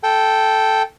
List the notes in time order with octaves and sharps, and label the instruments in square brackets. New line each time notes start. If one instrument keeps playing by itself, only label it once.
[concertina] A4 G5